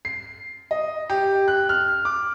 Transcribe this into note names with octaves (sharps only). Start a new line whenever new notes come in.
C7
D#5
G4
F#6
F6
D6